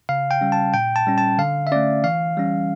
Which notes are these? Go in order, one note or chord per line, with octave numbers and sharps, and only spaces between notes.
C#3 F5
G5
G3 C#4
A5
A#2 G5
A5
G3 C#4
A5
D3 F5
E5
A3 C#4 D5
E3 F5
G3 C#4